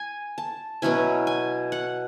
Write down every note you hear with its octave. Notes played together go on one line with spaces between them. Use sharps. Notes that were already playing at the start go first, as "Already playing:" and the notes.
Already playing: G#5
A5
B2 F#3 C#4 E4 G#5
G#5
F#5